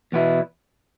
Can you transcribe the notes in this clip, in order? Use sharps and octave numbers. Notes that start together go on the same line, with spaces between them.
E2 B2 B3 E4